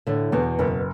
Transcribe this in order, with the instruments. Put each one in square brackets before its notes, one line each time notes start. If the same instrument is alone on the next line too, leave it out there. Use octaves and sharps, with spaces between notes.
[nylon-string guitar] A2 A3 [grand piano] D3
[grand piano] E2 [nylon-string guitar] B2 B3
[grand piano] F#1 [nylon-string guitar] B2 B3